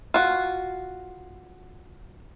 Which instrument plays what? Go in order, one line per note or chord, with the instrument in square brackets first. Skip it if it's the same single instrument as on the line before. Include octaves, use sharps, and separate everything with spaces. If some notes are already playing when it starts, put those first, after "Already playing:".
[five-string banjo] F4 F#4